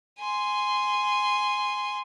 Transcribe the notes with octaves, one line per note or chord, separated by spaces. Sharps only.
G#5 C6